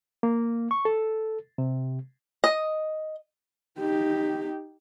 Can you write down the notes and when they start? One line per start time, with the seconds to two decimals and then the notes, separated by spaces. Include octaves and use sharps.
0.23 A#3
0.71 C#6
0.85 A4
1.58 C3
2.44 D#5
3.79 D#4 G4